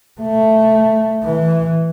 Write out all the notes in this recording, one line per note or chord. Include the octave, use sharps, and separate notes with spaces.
A3
E3